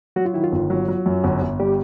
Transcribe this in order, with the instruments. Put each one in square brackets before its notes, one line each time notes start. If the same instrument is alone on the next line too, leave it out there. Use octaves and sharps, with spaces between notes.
[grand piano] F#3 [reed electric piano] F#4
[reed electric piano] F4
[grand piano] D#3 [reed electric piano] E4
[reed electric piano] F4
[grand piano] G1
F#3
F#3
F#2
G1
G1
[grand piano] G3 [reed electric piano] G4